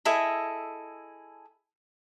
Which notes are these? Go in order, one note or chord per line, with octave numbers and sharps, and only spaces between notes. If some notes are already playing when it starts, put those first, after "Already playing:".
E4 G#4 A4 D#5